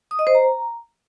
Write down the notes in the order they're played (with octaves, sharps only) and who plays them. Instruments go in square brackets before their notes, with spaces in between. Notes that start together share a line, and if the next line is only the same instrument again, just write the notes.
[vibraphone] D#6
D#5
C5
A#5